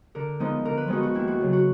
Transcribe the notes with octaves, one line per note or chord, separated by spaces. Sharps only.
D3 A#4
F3 G#3 B3 D#4
D3 A#4
B4
F3 G#3 B3 D#4 F#4
F#4
D#2 E4
F#4
C#3 F#3
F#4